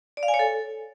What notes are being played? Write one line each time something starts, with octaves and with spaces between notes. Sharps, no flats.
D5
F5
G#5
C#5
A4